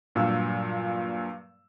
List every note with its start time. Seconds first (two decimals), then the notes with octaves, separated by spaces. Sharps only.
0.15 G2 A#2 F#3 F5 E6